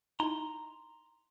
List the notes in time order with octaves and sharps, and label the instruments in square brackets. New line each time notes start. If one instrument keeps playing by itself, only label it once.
[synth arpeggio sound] D#4 E4 [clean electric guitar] A#5 C6